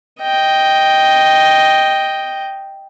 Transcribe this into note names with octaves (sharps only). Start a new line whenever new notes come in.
D#5 G5